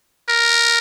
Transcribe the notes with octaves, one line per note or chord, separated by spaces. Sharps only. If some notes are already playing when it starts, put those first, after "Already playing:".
A#4